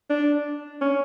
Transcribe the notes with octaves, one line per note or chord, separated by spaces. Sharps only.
D4
C#4